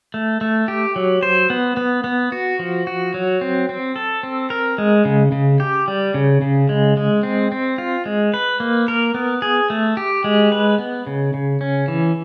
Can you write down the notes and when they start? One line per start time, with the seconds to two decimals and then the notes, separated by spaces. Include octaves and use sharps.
0.14 A3
0.41 A3
0.68 G4
0.96 F#3
1.23 C5
1.50 B3
1.77 B3
2.04 B3
2.32 F#4
2.59 F3
2.87 F#4
3.14 F#3
3.41 C4
3.69 C4
3.96 A4
4.23 C4
4.50 A#4
4.78 G#3
5.05 C#3
5.32 C#3
5.60 G4
5.88 G3
6.14 C#3
6.42 C#3
6.69 G#3
6.97 G#3
7.23 C4
7.52 C4
7.78 F4
8.06 G#3
8.34 B4
8.60 A#3
8.88 A#4
9.14 B3
9.42 G#4
9.70 A3
9.97 G4
10.24 G#3
10.52 B4
10.78 B3
11.07 C#3
11.34 C#3
11.61 C#4
11.88 E3